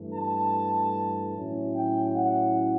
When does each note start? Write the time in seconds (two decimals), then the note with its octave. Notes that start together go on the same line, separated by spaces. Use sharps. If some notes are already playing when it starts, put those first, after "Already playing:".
Already playing: G2 E3 A3
0.13 A5
1.35 A2 F#3 C#4 E4
1.76 G5
2.17 F#5